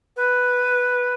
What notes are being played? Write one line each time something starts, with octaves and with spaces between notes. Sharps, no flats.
B4